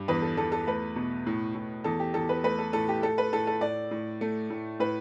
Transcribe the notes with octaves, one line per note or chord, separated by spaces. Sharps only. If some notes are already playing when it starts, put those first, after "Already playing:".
Already playing: G2
E2 B4
A4
E2 A4
A4
A3 B4
B2
A2
A2
E2 A4
G4
E2 A4
B4
A3 B4
A4
A2 A4
G4
A3 A4
B4
A2 A4
A4
A2 D5
A2
A3
A2
A2 B4